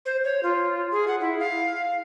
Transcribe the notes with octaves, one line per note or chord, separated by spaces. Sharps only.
C5
C#5
F4
G#4
F#5
E4
F5